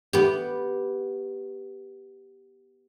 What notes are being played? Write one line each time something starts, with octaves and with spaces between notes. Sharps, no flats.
B3 G4